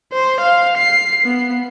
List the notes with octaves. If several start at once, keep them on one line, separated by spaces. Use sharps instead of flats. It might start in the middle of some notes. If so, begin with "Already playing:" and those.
C5
F5
C7
B3